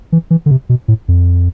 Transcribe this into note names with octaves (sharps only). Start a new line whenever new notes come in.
E3
E3
D3
C3
B2
A2
F2